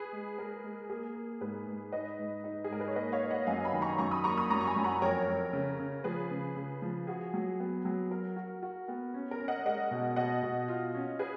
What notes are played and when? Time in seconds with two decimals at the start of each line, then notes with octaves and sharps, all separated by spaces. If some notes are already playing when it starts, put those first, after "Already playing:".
Already playing: G#4 B4
0.12 G#3
0.38 G#3 A#4
0.64 G#3
0.89 A#3 G#4
1.15 A#3
1.41 G#2 G#4 B4
1.67 G#2
1.92 D#4 B4 D#5
2.19 G#2
2.44 D#4
2.64 G#4
2.70 G#2 A#4
2.80 B4
2.88 C#5
2.96 A#3 B4 D#5
3.12 C#5 F5
3.21 A#3
3.31 D#5 F#5
3.47 F#2 F5 G#5
3.64 G#5 B5
3.73 D#3
3.82 A#5 C#6
3.98 F#2 A#5 C#6
4.11 B5 D#6
4.24 A#3 A#5 C#6
4.37 B5 D#6
4.50 F#2 A#5 C#6
4.61 C#6
4.67 G#5 B5
4.76 F#2
4.84 F#5 A#5
5.02 F2 A#4 C#5
5.28 F2
5.53 C#3
5.79 C#3
6.04 F3 G#4 B4
6.31 C#3
6.56 C#3
6.82 F3
7.07 F#4 G#4
7.34 F#3
7.60 B3
7.85 F#3
8.11 F#4 A#4
8.36 F#4
8.62 F#4
8.88 B3
9.14 C#4
9.31 A#4
9.40 C#4
9.48 D#5 F#5
9.65 G#3 D#5 F#5
9.91 B2
10.16 B2 D#5 F#5
10.43 B2
10.68 F4
10.94 C#4
11.19 G#4 B4